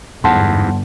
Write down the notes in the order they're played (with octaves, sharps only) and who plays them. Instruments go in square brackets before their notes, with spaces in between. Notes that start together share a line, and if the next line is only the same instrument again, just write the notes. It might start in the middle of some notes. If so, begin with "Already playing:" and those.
[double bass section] G1 [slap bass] E2 G#2 [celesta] F#5 A5 C6